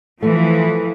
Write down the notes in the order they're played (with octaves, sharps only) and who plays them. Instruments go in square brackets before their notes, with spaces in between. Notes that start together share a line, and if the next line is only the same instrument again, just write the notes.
[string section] E3 F3 [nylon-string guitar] A3